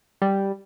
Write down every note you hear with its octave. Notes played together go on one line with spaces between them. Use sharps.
G3